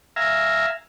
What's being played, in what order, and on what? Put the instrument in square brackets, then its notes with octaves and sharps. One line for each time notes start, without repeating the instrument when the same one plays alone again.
[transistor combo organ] E5 F5 G#5 A#5